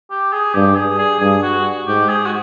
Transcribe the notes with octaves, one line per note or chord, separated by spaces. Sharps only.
G4
G#4
G2 G4
G#4
G#4
G2 G#4
F#4
G#2 G4
G#4
F#4